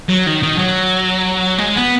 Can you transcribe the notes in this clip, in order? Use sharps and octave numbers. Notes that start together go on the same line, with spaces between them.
F#3
D#3
D#3
F#3
G#3
B3